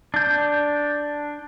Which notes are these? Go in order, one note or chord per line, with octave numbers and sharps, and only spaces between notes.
D4 G6